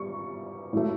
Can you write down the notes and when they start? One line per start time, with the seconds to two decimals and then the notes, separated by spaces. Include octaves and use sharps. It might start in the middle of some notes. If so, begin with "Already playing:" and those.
Already playing: G3 C#6
0.73 A2 F#3 A3